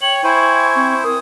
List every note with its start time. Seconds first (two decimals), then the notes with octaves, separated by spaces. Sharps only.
0.02 C#5 G5 F#7
0.24 E4 C5 G#5 C#6
0.75 C4
1.03 A#4 D#6